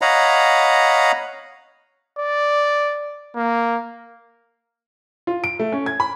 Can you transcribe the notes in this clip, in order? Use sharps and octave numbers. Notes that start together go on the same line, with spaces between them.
C#5 D#5 F5 F#5 A#5 B5
D5
A#3
F4
D7
A3
C#4
G#6
B5